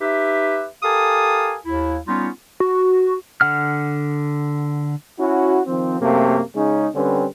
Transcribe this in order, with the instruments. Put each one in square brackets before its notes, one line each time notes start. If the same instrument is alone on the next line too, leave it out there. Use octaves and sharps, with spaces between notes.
[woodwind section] D#4 G4 B4 E5
G4 A4 A#4 F5 G#5 D#6
D#2 E4
G3 B3 C#4 D#4 F4
[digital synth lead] F#4
[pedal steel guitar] D3 F#5 F6
[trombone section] C#4 E4 F#4
D#3 F3 C4
F#2 C3 A3 A#3
C#3 G#3 C#4 D#4
D3 G3 C4 C#4 B4